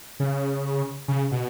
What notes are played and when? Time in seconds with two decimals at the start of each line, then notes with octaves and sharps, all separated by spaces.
0.20 C#3
1.08 C#3
1.31 B2